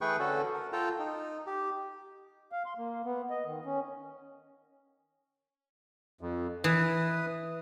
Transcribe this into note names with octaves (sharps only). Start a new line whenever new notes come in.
E3 A3 G#4 B4 G5 C#6
D3 C#4 F#4 A4
A#4
F4 A4 G5 A#5
D#4
G4
F5
C6
A#3
B3
D#5
D#3
C#4
F2
E3 B4 D#6